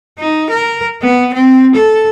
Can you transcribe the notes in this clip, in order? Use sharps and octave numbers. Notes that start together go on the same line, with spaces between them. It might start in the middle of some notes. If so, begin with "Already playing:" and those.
D#4
A#4
B3
C4
A4